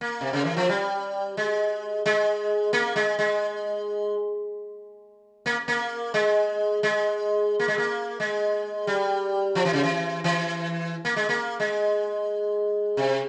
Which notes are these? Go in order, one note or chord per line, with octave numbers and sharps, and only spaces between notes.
A#3
C3
C#3
E3
F3
G3
G#3
G#3
A#3
G#3
G#3
A#3
A#3
G#3
G#3
A#3
G#3
A#3
G#3
G3
F3
E3
C#3
E3
E3
A#3
G#3
A#3
G#3
C3